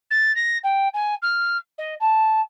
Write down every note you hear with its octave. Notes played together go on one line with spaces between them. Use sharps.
A6
A#6
G5
G#5
F6
D#5
A5